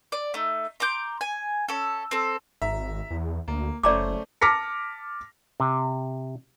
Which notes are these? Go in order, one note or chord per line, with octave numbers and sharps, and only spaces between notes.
D5
A3 D#4
A#5 C6 D6 G6
G#5
C#4 A4
C4 A4
G#1 E5 A#5
E2
D2 A#3
F#1 A3 C#4 C5 D5 A#5 D6
A5 D6 F6 A#6 B6 C#7
C3